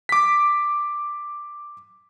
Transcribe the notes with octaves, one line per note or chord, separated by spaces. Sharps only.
D6 B6